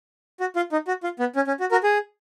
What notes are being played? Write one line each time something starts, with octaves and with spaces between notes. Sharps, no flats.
F#4
F4
D#4
F#4
F4
B3
C#4
C#4
F#4
F#4 A#4
G#4